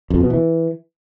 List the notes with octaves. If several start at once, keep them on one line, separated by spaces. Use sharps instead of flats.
F2
B2
E3